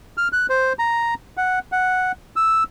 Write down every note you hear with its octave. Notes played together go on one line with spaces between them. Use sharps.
F6
F#6
C5
A#5
F#5
F#5
E6